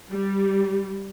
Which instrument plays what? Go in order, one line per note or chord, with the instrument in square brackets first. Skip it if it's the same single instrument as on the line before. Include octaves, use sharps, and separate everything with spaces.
[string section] G3